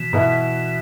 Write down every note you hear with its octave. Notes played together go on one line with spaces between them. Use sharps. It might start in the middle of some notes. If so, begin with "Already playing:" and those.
Already playing: B2 E3
B2 B3 E4